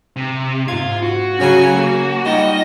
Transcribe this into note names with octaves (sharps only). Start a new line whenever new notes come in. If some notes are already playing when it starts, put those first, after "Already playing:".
C3
G#2 F4 G#6
F#4
C#3 F#3 C#4 C#5 G#5 C7
A#3
G3 D#4 F4 D#5